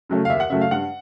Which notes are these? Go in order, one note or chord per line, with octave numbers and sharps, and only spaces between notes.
C#3 F#3 A3
F5
D#2 E5
F#5
C#3 F#3 A3 E5
F5
G2 F#5